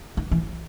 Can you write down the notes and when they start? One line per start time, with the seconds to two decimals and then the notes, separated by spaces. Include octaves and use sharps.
0.17 D#3
0.31 E3